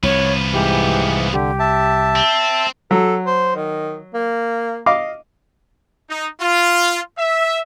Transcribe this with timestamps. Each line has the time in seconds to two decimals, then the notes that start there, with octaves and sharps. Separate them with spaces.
0.03 C2 F3 B3 C#5
0.52 G#2 E3 G4
1.32 D3 G4
1.59 E5 A5
2.16 C4
2.91 F#3 A4
3.26 C5
3.55 D#3
4.14 A#3
4.86 D#5 F5 D6
6.09 D#4
6.40 F4
7.18 E5